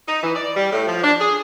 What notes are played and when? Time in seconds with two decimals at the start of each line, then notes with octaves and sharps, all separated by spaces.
0.07 D#4
0.23 E3
0.35 D5
0.55 G3
0.73 A2
0.87 F3
1.03 D4
1.20 G#4